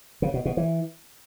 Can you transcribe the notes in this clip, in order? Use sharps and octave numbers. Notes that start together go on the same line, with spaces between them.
C#3
B2
B2
E3